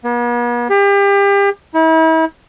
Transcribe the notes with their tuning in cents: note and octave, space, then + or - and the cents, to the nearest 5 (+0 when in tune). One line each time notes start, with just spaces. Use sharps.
B3 -45
G4 +35
E4 -40